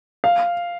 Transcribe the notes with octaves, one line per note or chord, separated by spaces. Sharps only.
F5